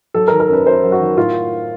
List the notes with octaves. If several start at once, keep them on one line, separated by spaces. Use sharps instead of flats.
F#3 A4
A#4
D#3
A#4
F#2 B4
F#2 C5
F#3
F#4
D#3
A2 F4